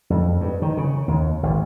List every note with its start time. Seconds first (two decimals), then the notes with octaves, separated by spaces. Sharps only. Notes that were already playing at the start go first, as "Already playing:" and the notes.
0.10 F2
0.40 G2
0.62 D#3
0.77 C#3
1.08 D#2
1.43 G#1